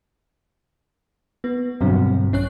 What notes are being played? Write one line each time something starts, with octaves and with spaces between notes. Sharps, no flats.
B3
G2 B2 D3 F#3 C4
A#1 C#4 C#5 F#6